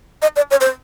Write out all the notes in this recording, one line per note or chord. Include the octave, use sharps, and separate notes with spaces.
D#5
D5
C#5
C5